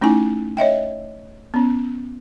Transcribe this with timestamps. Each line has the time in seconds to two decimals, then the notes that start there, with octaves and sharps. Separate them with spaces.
0.01 A3 C#4 D#4 E4 G#5
0.57 C#5 D#5 E5 G5
1.54 B3 C#4